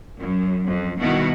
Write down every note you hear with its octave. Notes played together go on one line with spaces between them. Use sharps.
F#2
F2
B2 D#3 G3 B3 E4 F#4